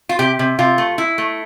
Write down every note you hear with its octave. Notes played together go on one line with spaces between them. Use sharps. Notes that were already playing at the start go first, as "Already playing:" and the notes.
F4
C3 G4
C3
C3 F4
A3
E4
A3